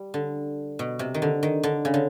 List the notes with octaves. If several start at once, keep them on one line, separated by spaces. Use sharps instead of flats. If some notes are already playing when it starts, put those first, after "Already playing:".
Already playing: G3
D3
B2
C3
D#3
D3
D#3
D3
C#3
D3